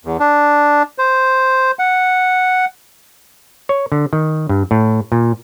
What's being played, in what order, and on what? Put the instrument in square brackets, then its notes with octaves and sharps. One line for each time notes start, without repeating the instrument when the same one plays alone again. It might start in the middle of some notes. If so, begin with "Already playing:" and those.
[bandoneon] E2
D4
C5
F#5
[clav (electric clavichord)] C#5
D3
D#3
G2
A2
A#2